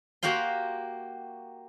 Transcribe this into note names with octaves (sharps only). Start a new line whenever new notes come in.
A#3 F#4 G4 F5 C6